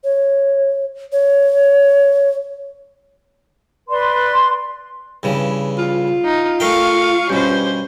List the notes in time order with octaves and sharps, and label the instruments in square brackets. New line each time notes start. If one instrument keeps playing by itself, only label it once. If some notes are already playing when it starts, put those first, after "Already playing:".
[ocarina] C#5
C#5
[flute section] B4 D5 C6
[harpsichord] G2 C#3 E3
[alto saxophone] F4
[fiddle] D#4
[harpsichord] A3 A#4 G5 [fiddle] F5 C#6
[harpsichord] G2 B2 [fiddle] C#4 C5 [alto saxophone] G4